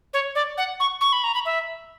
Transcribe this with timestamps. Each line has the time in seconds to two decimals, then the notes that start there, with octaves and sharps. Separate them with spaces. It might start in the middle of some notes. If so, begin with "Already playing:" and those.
0.13 C#5
0.35 D5
0.58 F#5
0.80 C#6
1.01 C#6
1.13 B5
1.24 A#5
1.34 B5
1.45 E5